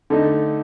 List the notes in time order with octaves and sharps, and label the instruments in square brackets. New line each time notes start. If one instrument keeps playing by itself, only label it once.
[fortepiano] D3 A3 D#4